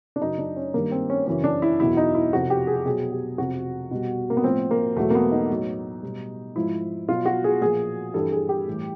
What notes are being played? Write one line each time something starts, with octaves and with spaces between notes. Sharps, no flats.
D4
F#2 C#3 F#3 D#4
D4
C#4
G2 D#3 G3 A#3
C4
C#4
F#2 C#3 E3 C#4
D4
E4
E2 B2 F#3 E4
D#4
E4
F2 C3 F3 F#4
G4
G#4
B2 F#3 G#4
G4
F2 C3 F3 F#4
B2 G3
A#3
B3
A2 F3 C4
A#3
E2 B2 F#3 A3
A#3
B3
D#4
A2 F#3
B2 G3
G#2 F3 E4
B2 F#3 F4
F#4
G#4
A#2 F3 G#4
G2 E3 G3 A4
G#4
G4
A2 E3 G3